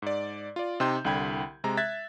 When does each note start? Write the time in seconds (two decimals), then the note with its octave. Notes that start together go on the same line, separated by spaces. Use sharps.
0.02 G#2 D5
0.56 F4 D5
0.80 C3 D#4 G5 C6 G6
1.05 C2 D3 G5 B5 G#6
1.64 C3 G#3 A#5
1.77 E5 F#6 G#6 A6 B6